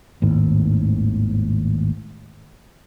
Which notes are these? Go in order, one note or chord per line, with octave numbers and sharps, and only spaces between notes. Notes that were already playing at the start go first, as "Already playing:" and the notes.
G#1 D#2 A2